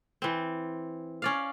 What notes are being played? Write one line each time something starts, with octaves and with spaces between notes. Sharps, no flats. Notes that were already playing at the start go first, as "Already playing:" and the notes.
E3 C4
C#4 D5 F5